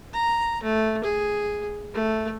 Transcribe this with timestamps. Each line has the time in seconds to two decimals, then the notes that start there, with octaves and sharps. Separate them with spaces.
0.14 A#5
0.63 A3
1.04 G#4
1.94 A3